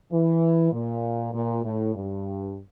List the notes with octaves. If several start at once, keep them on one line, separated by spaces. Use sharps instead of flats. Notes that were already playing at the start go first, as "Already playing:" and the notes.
E3
A#2
A#2
A2
G2